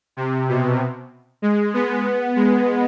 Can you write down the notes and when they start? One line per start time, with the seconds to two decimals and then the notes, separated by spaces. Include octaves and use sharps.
0.17 C3
0.49 B2
1.42 G#3
1.74 B3
2.36 G#3